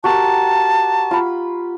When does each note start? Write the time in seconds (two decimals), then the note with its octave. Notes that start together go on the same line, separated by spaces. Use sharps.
0.04 F#4 G4 A#4 A5
1.11 F4 B5